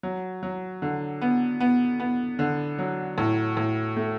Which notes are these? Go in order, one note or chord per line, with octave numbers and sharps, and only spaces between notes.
F#3
F#3
D3
B3
B3
B3
D3
F#3
A2
A2
A3